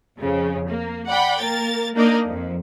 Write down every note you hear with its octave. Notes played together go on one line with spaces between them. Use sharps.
F2 C#3
A#3
D5 F#5 G5 B5
A#3 A#4 A6
A#3 D4 D#4 A#4 D5 D#5
F2